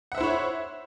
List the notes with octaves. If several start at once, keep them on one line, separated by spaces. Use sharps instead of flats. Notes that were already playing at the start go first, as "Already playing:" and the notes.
E4 C5 C#5 E5 F#5